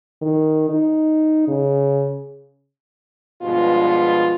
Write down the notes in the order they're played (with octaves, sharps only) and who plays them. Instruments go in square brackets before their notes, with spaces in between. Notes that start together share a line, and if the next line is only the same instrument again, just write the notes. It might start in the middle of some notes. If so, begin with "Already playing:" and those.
[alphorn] D#3
D#4
C#3
[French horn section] G2 B2 F3 G#3 F4